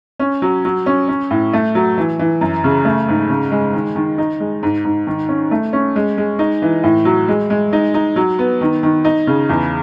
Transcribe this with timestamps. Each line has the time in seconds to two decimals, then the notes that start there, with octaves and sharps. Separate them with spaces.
0.19 C#4
0.42 F#3
0.65 F#3
0.86 C#4
1.08 C#4
1.31 A2
1.53 A3
1.75 F#3
1.98 E3
2.19 E3
2.41 F#2
2.64 C#3
2.85 A3
3.08 G#2
3.30 C#3
3.51 G#3
3.73 D#3
3.96 D#3
4.18 D#4
4.40 G#3
4.63 G#2
4.85 G#2
5.07 D#3
5.29 C#4
5.51 A3
5.73 C#4
5.96 G#3
6.18 G#3
6.39 D#4
6.62 E3
6.83 A2
7.05 F#3
7.28 G#3
7.50 G#3
7.73 D#4
7.94 D#4
8.16 F#3
8.39 B3
8.61 D#3
8.83 D#3
9.05 D#4
9.27 C#3
9.49 E2